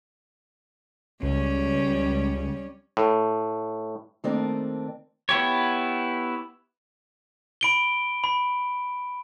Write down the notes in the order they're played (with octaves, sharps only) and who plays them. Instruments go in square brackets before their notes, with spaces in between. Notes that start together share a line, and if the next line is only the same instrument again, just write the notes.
[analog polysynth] C#2 [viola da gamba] G3 C#4
[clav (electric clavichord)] A2
[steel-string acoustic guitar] D#3 A3 A#3 C4 D4 D5
[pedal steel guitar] B3 E4 G4 C#5
[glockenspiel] B5 D7 G7
B5